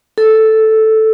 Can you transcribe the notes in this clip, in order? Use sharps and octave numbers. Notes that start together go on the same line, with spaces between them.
A4